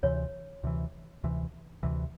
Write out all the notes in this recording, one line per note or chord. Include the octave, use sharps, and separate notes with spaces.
D2 C3 E3 C#5
D2 C3 E3
D2 C3 E3
D2 C3 E3